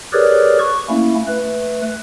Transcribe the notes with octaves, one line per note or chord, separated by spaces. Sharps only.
G4 G#4 A#4 B4 C#5 D5
C#6
A3 A#3 C#4 E4
A3 B4